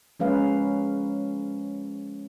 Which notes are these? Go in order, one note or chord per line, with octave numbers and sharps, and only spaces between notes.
F3 G#3 C#4 A#4 B4 F5